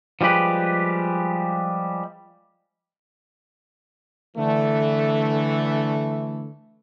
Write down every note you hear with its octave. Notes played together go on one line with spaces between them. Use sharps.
F3 G3 G#3 G4 B4
D3 E3 A3